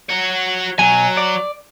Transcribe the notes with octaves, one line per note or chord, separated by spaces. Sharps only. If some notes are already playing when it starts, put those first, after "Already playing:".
F#4 C#5
B2 F#3 G#5
D5